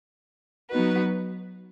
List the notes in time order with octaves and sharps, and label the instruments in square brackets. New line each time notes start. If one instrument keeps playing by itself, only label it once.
[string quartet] F#3 B3 D#4 F#4 B4